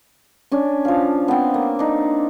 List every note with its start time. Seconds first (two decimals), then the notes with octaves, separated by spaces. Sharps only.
0.51 C#4 D4
0.85 F3 F5
1.28 B3 C4
1.54 A#3
1.79 D4 D#4